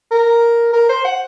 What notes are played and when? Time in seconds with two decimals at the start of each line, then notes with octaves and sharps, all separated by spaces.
0.11 A#4
0.73 A#4
0.89 C5
1.05 F#5